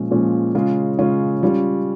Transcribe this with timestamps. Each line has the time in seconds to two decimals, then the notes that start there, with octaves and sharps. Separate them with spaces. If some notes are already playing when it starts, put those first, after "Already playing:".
Already playing: A#2 F3 G#3 C#4
0.11 A#2 F3 G#3 C#4
0.55 C#3 G#3 C#4 F4
0.99 C#3 G#3 C#4 F4
1.43 G3 C#4 F4